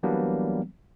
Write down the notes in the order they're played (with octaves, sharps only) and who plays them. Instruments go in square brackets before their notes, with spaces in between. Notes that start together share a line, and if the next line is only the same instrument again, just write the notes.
[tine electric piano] E3 F#3 G3 A#3 B3 D4